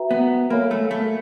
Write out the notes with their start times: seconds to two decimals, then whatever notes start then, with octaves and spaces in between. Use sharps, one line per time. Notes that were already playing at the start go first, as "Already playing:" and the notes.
Already playing: F#4 B4 E5 G5 A#5
0.11 B3
0.50 A#3 A4 C#5 F5 G#5 B5
0.71 A3
0.91 A3